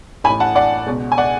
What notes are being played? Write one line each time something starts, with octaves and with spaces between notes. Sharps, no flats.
A1 A2 G#5 B5
F#5 A5
D5 F#5
C#2 B2
G#5
D5 F#5